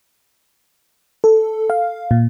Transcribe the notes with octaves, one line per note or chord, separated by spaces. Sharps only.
A4
F5
A#2